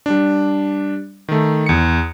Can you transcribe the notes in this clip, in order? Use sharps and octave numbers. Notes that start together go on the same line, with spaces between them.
G3 D4
D#3 A3
E2 C#7